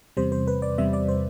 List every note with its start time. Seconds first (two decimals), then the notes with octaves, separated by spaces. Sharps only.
0.17 E2 C3 G3 C5
0.32 C5
0.48 B4
0.62 D5
0.78 E2 C3 G3 E5
0.93 D5
1.08 C5